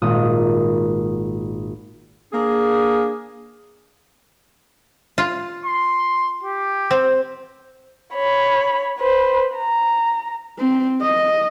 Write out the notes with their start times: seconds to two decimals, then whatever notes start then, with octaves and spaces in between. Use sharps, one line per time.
0.02 G#1 A#2 D#6
2.33 A#3 D4 G#4
5.18 F4
5.66 C6
6.43 G4
6.91 C4
8.14 C#5 B5
8.99 B4 C5
9.56 A#5
10.59 C4
11.01 D#5